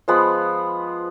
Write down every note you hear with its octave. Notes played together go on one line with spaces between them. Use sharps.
F3 G#3 B3 B5